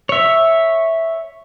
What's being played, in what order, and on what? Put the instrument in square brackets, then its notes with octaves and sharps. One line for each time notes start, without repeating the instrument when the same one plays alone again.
[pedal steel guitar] C#5 E5